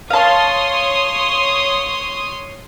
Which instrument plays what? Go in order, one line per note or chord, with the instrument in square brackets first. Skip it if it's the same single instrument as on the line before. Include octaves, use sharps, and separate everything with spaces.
[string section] C#5 C6 D#6 [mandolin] F5 A5